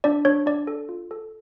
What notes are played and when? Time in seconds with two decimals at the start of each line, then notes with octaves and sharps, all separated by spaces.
0.04 D4 D5
0.25 D4 C#5
0.46 D4 D5
0.67 A4
0.89 F4
1.11 A4